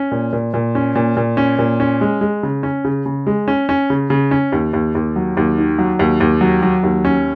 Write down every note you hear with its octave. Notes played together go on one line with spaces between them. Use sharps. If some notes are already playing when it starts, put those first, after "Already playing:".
Already playing: C#4
A#2
A#2
A#2
C#4
A#2
A#2
C#4
A#2
C#4
G#3
G#3
C#3
C#4
C#3
C#3
G#3
C#4
C#4
C#3
C#3
C#4
D#2
D#2
D#2
F#3
D#2
D#3
F#3
D#2
D#2
F#3
F#3
D#2
C#4